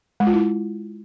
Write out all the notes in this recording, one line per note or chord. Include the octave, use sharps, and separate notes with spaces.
G#3
F4
E4